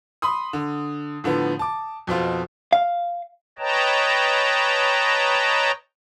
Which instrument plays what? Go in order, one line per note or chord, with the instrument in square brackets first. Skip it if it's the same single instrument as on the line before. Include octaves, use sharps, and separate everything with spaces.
[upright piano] B5 C6 D#6
D3
A2 D3 F3 B3
A5 D6
F2 B2 C4 F4
[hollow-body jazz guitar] F5
[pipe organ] B4 C#5 D#5 G5 A5 A#5